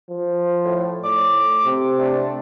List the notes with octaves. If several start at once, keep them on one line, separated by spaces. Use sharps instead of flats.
F3
A2
A2 D6
C3
A3 D4